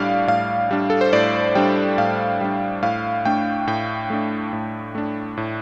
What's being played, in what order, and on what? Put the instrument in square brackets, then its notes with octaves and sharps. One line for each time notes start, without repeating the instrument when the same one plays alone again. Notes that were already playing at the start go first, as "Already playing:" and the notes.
Already playing: [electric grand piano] A2 G3 D4 D5 F5
A2 F5
G3 D4
A4
C5
A2 D5
G3 D4 G5
A2 F5
G3 D4
A2 F5
A3 D4 G5
A2 G5
A3 D4
A2
A3 D4
A2